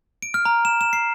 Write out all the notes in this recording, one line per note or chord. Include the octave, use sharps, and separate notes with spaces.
D7
F6
A#5
E7
E7
C7